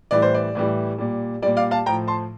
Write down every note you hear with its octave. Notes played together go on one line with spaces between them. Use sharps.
A2 E3 G3 D5
C5
D5
A2 E3 G3
A#2 G3
A#2 G3 D5
D5 F5
F5 A5
A2 F3 G5 A#5
A5 C6